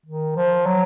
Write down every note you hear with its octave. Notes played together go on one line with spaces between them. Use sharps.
D#3
F3
F#3